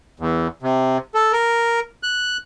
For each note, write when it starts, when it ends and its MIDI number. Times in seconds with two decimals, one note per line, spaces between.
0.20 0.48 40
0.63 0.98 48
1.15 1.32 69
1.33 1.80 70
2.03 2.37 90